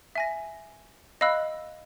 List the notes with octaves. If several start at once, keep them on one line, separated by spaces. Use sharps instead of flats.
E5 G#5 A#6
D#5 F5 B5 E6 F#6